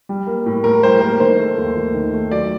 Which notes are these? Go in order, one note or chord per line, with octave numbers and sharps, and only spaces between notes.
G3
A#3
A2
A2 A#4
G3 C5
A#3 A#4
D#3 C5
A3
D#2
D#2
D#3
A3
F#3 D5